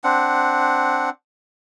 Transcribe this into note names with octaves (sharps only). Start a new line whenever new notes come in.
C4 D4 F#5